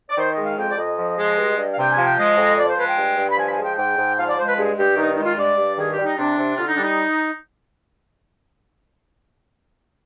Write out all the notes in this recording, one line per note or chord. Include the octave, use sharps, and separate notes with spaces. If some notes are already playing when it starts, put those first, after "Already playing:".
D5
D#3 C5
D#5
G#3
F5
F2 G5
D5
F2 D#5
F3
G#3
G2
G2
F5
C3 G5
G#5
F3
G5
G#3 D#5
F2
F3 D5
C5
G#3 B4
G5
G2
G2
B5
F3 G#5
B5
G#5
G#3
G5
G#2 G5
G#2
F3 F5
D5
G#3 C5
B4
G2 G#4
G2 G4
D#3 D#4
G#3 D#4
F4
G2 D5
G2
D#3 G#4
G4
G3
D#4
C3 D4
C3
D3 F4
D#4
G3 D4
D#4